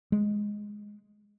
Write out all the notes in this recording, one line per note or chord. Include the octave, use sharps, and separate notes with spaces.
G#3